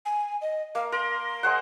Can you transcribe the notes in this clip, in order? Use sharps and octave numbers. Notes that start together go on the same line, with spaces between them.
G#5
D#5
A#3 F5
A#4 C6
G#3 C5 F#5